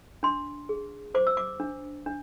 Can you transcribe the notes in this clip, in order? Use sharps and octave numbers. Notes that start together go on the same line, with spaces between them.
D4 C6
G#4
C5 D6
E6
D6
D4
D4